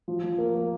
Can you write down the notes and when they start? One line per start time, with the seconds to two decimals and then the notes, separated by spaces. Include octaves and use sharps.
0.08 F3
0.23 F3
0.38 A#3
0.55 A#3